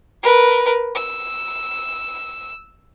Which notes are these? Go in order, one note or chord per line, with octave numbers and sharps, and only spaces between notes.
A#4 B4
E6